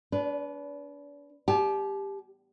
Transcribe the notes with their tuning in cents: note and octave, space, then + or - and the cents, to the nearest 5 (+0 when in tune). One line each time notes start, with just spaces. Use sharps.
D4 -40 B4 +0
G4 +15 A5 -40